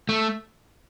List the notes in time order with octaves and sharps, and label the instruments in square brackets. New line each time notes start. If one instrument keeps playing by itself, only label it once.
[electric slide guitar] A3